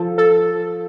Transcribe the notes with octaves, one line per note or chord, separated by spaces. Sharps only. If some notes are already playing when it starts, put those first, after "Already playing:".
Already playing: F3 A4
A4